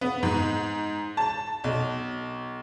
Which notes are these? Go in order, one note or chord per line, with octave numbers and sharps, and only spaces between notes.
B3
G#2
A5
B1